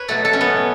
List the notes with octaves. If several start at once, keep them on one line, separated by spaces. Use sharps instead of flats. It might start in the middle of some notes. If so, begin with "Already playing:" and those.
Already playing: B4 C#5
B2 F#3 A3 A4
A4
C#4
B3